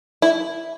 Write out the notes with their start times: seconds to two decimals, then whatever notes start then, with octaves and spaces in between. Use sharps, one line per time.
0.22 E4